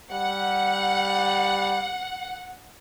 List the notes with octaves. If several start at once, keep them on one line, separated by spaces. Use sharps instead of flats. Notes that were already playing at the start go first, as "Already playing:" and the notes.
G3 F#5